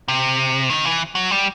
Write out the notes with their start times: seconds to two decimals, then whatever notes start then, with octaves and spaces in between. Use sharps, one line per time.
0.08 C3
0.70 D#3
0.85 E3
1.15 F#3
1.31 G3